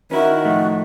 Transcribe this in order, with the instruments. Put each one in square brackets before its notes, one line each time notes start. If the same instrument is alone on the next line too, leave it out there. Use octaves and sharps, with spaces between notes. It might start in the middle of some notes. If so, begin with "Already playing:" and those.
[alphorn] D#3 [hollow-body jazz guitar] C#4 E4 [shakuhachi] F#4 [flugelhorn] A#4
[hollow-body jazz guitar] A2 F3 A3